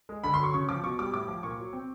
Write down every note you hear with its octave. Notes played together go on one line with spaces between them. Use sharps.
G#3
D3 B5
C6
F#3 C#6
C#3 C#6
F3 D6
B2 C#6
G3 D6
A2 D6
F3
A#2 C#6
F#3
C4